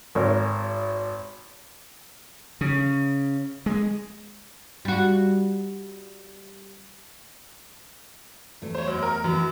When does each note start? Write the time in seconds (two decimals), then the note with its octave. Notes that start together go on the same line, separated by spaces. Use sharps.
0.15 G#1 A#4 C#5
2.61 C#3
3.66 G#3
4.85 G3 F#4
8.62 E2 A3
8.75 C5 C#5
8.88 F#2
9.03 A#4
9.24 F#2 E3 E4